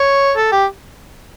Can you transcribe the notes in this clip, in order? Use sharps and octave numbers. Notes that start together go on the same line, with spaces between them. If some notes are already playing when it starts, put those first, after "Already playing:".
Already playing: C#5
A4
G4